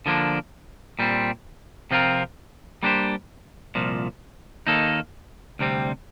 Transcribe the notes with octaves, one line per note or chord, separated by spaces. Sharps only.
D3 F3 A#3 D4
A#2 G3 C4
C3 F3 C4 F4 A#4
G3 A#3 D4 G4 C5
C2 A#2 F3
D#2 D#3 A#3 D#4 A4
D2 C3 G3 C4